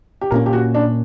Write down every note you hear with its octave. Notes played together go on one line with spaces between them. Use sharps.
G4
A#2 A#3 C#4 A#4
G4
F#4
D4